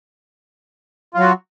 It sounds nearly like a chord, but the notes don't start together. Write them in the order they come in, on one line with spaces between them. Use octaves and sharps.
F4 F#3 F#4